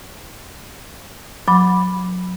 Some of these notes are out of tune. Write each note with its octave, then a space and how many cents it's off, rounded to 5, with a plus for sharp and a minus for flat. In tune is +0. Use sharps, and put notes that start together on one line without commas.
F#3 -25 B5 +0 D6 +0